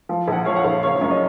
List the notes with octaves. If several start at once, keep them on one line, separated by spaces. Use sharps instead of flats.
F3
A#1 F#5
F3 C#5 F5
F#5
A#1 C#5 F5
F#1 C#5 F5
F#2 C#5
D#5